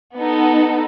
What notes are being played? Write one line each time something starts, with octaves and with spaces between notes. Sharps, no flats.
B3 D#4 A4